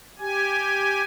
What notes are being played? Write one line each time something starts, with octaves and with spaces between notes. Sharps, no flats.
G4 G#5